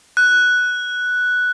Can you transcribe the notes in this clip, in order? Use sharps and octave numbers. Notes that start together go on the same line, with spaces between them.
F#6